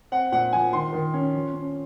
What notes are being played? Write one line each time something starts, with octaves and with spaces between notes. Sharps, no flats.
C4 F#5
A#2 F#5
F3 G#5
D#3 C6
D#3
C#4
F3
C#4